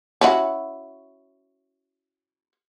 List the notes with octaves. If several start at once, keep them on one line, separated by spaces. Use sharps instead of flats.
C#4 E4 F#4